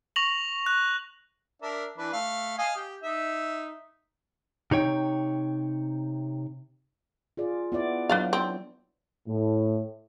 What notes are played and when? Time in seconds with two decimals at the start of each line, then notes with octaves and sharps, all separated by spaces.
0.16 C#6 A#6 F7 F#7
0.66 F#6
1.62 D4 A#4 E5
1.98 E3 D4 B4
2.13 A3 F5
2.58 D#5 F5 G#5
2.76 G4 G5
3.03 D#4 E5
4.71 C3 D#4 C#5 G5
7.37 F4 G#4 D5
7.72 B3 E4 D5
8.09 F#3 D4 B4 D5 F5
8.33 C4
9.28 A2